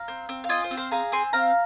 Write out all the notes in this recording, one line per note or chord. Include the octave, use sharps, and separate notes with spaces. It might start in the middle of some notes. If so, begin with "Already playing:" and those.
Already playing: F5 A#5
C4
C4
F5
F4 D#5 G#5
C5
C4
C5 F5
G#4 F5 A#5
C4 G#5 C6
C4 F5 A#5